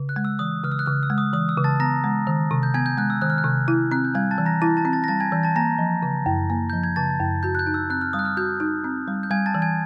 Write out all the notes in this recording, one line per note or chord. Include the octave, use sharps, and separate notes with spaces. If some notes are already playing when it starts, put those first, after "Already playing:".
Already playing: C#3
F#6
G#3
E6
E3 D#6
C#3 F6
E6
F#6
C#3 F6
E6
G#3
D#6
E3 D#6
E6
C#3
A5 A6
B3 A#5 A#6
G#3
D#3
C3
G6
B3 G#5 G#6
G6
G#3 F#6
E6
D#3 F#6
F6
F#6
C3
E4
C4 F#6
G6
G3 G#5 G#6
A5 A6
E3
A#5 A#6
E4 A5 A6
A5 A6
C4
A5 A6
A#6
G3 A5 A6
G#5 G#6
E3 G6
A5 A6
A#3 A#5 A#6
F3
C#3
F#2
A#3
F3 G6
G#6
C#3 A5 A6
F#2
F#4 G6
F#6
G6
D#4
E6
C4 F#6
F6
G3 D#6
F#6
F6
F#4 G6
D#4
C4
G3
G6
G3 G#5 G#6
A5 A6
E3
G#5 G#6